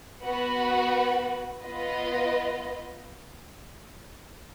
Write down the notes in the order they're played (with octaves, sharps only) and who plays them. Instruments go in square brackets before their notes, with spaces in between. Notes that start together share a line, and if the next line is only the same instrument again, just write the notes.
[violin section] B3 F#4 B4 F#5
B3 F4 B4 D#5